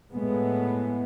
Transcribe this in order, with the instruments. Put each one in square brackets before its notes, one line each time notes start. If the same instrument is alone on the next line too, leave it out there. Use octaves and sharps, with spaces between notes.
[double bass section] A2 G#3 B3